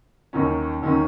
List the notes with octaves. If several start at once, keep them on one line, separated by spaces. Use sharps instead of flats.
D#2 D#3 F#3 C#4
D#2 D#3 F#3 C#4